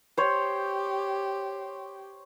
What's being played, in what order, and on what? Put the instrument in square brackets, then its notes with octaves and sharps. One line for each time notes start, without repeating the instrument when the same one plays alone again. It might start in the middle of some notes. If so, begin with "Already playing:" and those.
[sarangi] G4 [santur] C5 C#5